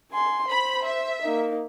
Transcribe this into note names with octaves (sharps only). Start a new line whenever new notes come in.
G#5 C6
C5 B5
E5
A#3 D#4